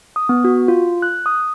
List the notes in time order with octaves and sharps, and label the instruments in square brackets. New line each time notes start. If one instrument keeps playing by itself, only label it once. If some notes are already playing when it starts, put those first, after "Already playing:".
[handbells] D#6
B3
F#4
F4
F#6
D#6